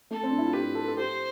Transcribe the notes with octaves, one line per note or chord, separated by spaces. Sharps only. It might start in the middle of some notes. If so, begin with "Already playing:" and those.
A3 A4
C4
D4
E4
F4
G4 B4
A4
A4
G4 C5